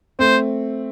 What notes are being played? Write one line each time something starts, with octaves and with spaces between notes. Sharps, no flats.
A3 C4 C5